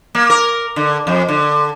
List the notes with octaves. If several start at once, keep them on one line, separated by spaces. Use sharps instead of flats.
A#3
A#4
D3
F2
D3